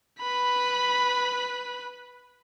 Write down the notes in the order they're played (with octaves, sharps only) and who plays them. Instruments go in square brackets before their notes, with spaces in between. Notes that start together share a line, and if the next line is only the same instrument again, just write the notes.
[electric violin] B4 B5